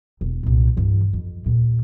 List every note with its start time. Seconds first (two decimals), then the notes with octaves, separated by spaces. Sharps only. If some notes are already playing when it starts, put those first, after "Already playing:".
0.21 E1
0.43 C2 A#2
0.77 G2 E3
1.13 F2
1.46 D#2 A#2